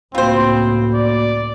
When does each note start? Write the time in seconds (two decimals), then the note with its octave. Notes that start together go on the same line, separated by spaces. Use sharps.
0.15 C#2 A2 A#3 C4 F4 F#4 C5 B5
0.94 D5